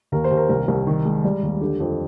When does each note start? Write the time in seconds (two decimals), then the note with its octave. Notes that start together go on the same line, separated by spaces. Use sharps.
0.12 D#2 A#4
0.24 C5
0.31 D#2
0.37 A#4
0.49 C2 A#4
0.68 C2
0.87 D#3
1.05 G#3
1.24 G3
1.43 D#2
1.61 D3 G4
1.80 F2